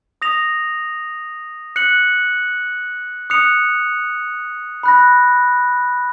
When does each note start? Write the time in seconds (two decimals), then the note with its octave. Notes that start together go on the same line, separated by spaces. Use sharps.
0.22 D#6 A#6 F7
1.76 F#6 C#7 F#7
3.30 D#6 F#6 C#7 F7
4.83 B5 F#6 A#6